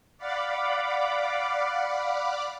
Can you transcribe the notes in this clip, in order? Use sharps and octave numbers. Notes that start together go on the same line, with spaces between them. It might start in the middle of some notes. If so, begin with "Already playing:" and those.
D5 F5 F#5 B5 D6